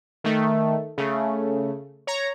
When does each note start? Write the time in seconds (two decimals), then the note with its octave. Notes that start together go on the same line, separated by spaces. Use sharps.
0.24 D#3 A3
0.98 C#3 A3
2.07 C#5 A#5